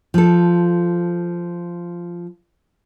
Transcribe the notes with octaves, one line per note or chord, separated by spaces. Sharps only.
F3 A4